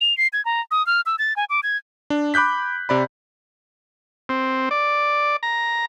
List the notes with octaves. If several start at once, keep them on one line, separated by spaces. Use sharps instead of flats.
F7
C7
G#6
A#5
D#6
F6
E6
A6
G#5
D6
G#6
D4
B5 D6 F#6 G6 B6
C3 D5 B5
C4
D5
A#5